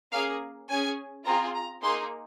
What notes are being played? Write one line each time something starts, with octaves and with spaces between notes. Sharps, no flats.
A#3 C#4 G#4 F5
C#4 G#4 G#5
C4 F4 G#4 A#5
A#5
A#3 D#4 G#4 C6